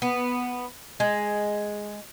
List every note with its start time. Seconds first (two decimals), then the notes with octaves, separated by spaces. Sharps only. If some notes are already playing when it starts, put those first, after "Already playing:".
0.02 B3
1.00 G#3